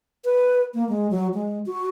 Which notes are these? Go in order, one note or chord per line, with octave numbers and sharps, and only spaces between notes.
B4
A#3
G#3
F#3
G#3
F#4